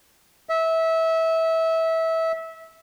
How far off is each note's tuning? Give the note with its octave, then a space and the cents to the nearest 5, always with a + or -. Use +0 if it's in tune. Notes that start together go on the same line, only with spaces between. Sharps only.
E5 -20